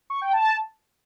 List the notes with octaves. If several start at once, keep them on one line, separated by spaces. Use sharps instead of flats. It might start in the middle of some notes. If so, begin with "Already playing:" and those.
C#6
G5
A5